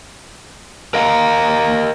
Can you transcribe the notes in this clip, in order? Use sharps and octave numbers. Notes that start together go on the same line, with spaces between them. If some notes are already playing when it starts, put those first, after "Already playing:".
A#4 D#5 F5 G5 A5 A#5